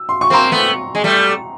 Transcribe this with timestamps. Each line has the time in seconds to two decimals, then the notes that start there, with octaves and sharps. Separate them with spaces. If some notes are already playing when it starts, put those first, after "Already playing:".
Already playing: E6
0.09 C6
0.21 C#6
0.30 A#3 C4 A#5 C6
0.51 A3 B3
0.95 G#3
1.04 G3 A3